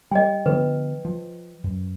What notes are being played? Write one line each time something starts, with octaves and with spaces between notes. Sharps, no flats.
G3 D#5 G5
D3 F3 B3 B4
F3
F#2